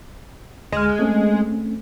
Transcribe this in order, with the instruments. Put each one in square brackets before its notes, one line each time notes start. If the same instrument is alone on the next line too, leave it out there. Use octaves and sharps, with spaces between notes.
[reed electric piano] D2 F6 [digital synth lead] G#3
[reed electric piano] A3 C4 C#4